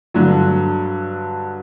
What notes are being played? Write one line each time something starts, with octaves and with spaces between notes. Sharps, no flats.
G2 D3 F#3